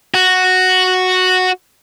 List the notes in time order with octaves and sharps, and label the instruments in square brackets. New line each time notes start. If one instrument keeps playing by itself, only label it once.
[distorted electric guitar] F#4